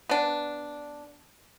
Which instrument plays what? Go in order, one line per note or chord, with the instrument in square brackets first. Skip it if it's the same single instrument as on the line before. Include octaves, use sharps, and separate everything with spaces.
[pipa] B3 D4